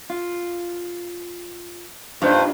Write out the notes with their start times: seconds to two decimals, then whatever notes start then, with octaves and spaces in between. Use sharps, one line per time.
0.10 F4
2.22 G2 D4 D#4 F4 C5